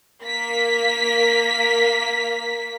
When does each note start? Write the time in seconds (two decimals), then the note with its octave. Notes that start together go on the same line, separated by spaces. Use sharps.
0.24 A#3 B6